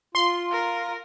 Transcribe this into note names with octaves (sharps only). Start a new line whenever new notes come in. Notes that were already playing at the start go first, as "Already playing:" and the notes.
F4 C6
A#4